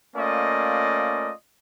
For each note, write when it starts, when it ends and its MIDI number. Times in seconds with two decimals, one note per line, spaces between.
0.17 1.32 57
0.17 1.32 58
0.17 1.32 61
0.17 1.32 65
0.17 1.32 74
0.17 1.32 75